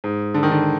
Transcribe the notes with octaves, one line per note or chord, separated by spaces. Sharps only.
G#2
D3
D#3
D3